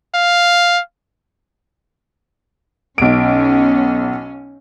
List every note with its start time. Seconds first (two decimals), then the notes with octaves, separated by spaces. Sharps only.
0.15 F5
2.98 B1 C#4 D7